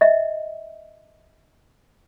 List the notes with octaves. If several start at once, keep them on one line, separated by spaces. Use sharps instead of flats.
D#5 E5